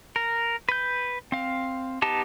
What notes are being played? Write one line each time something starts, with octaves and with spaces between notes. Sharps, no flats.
A#4
B4 G6
C4 F5
B3 D#4 G4 A5